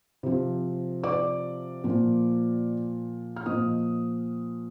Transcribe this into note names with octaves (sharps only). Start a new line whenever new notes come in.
C3 F3
D5 D6
A#2 F3
F6
A#2 F3 D#5 D#6